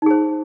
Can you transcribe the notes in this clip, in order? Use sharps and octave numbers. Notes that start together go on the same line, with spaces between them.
D#4 G#4 C5